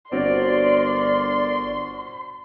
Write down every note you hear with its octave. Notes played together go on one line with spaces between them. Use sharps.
G1 C4 D4 F#4 A#4 C#5 D5 C6